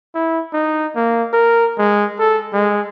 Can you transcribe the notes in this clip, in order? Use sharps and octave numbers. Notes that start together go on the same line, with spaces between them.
E4
D#4
A#3
A#4
G#3
A4
G#3